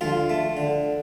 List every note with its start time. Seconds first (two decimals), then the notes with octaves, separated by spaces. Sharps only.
0.01 D2 F3 F4
0.29 A3
0.57 D3